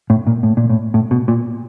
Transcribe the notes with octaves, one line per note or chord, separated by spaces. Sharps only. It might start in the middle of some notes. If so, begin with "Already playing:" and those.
A2
A#2
A2
A#2
A2
A2
B2
A#2